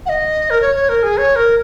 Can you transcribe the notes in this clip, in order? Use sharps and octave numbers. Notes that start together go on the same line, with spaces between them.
F#5
D#5
A#4
C#5
C#5
A#4
G#4
C#5
A#4